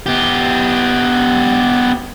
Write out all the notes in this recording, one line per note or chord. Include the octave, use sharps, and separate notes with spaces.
B3 G4